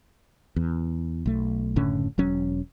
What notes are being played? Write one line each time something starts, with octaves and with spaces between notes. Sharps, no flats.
E2
B1 A3
F#1 A2 D3 C#4
E1 F#3 C#4